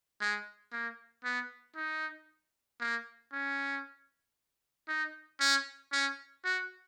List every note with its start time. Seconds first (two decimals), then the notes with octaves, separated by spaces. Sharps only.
0.21 G#3
0.72 A#3
1.24 B3
1.76 D#4
2.80 A#3
3.32 C#4
4.88 D#4
5.40 C#4
5.92 C#4
6.44 F#4